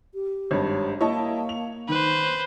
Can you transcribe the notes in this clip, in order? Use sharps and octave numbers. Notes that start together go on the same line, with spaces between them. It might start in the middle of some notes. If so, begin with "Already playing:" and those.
G4
G#1 G2 C#5
A#3 E4 C#5 D#5 A5
F7
D#3 B4 C5